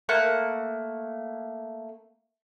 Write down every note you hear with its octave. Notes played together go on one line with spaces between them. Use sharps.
A3 A#3 F#5